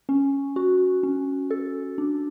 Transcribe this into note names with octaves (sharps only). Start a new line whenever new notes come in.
C#4
F#4
C#4
A4
D4